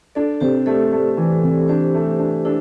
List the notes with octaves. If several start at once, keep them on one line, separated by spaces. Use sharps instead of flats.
D4 A4 D5
C3 G4 C5
A3 A4 D5
A3
E3
C3
D4 G4 C5
A3
D4
D4 E4 A4